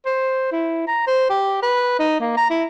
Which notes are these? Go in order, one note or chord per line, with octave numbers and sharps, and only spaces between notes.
C5
E4
A#5
C5
G4
B4
D#4
A#3
A#5
E4